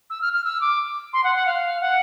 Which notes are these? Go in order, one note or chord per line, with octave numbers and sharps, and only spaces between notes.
E6
F6
F6
E6
D6
C6
F#5
F#5
F5
F#5